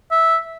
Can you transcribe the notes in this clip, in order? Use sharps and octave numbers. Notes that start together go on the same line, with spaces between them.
E5